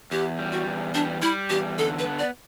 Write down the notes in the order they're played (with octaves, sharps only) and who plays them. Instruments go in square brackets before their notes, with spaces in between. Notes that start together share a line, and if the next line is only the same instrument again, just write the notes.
[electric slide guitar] E2 [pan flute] G4
[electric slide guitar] G3
[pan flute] F#4
[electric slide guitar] E2
[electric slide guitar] G3 [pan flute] D4
[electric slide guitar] G3 [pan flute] E4
[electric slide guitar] E2 [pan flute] G4
[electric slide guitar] D3 [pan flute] A4
[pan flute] B4
[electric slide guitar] B3
[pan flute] D5